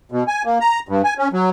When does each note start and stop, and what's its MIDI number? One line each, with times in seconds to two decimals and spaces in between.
0.12 0.23 47
0.28 0.42 80
0.45 0.58 58
0.61 0.79 82
0.89 1.02 43
1.04 1.14 80
1.18 1.28 61
1.33 1.50 54